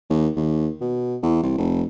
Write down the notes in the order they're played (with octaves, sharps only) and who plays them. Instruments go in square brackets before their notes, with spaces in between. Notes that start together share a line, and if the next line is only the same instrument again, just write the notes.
[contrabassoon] D#2
D#2
B2
E2
C2
F1